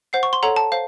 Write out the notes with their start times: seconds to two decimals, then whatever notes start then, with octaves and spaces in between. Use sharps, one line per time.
0.13 C5 F#5 C7
0.23 C#6
0.33 C6
0.43 A4 C#5 F#5 A#5
0.56 A5
0.72 C5 F5